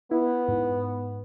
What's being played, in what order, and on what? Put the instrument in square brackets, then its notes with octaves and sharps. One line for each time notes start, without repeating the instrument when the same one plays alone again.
[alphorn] B3 [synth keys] E4
[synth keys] G#2